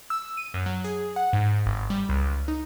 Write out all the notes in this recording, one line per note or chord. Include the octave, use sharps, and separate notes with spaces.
E6
D#7
F#2
F#3
G#4
F#5
G#2
G1
G3
C#2
D#4